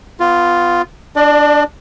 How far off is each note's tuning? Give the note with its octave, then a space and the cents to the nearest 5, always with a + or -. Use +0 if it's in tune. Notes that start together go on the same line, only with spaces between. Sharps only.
B3 +25 F4 +0
D4 +0 D5 +40